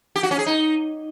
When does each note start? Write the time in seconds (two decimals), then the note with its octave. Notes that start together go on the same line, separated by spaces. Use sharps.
0.16 G4
0.23 F#4
0.31 C#4
0.39 G#4
0.46 D#4